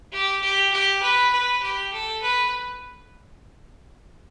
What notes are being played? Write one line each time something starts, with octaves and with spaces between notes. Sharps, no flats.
G4
G4
G4
B4
B4
G4
A4
B4